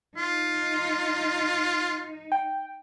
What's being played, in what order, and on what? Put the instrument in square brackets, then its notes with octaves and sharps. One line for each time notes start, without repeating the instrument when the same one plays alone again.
[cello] D#4 [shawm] F4
[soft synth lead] G5